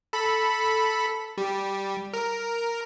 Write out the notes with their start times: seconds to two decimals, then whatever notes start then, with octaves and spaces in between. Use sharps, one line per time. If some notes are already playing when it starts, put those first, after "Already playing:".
0.13 A4 B5
1.38 G3
2.14 A#4